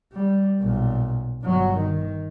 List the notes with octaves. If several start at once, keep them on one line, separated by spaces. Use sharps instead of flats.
G3
B1 A#2
G1 F#3
D#3